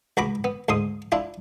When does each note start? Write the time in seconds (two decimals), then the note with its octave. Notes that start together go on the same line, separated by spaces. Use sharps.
0.17 C#2 F#4 A#5 B5 D6
0.44 B3
0.69 D2 G#2 C6 D#6
1.12 D4 E4 F4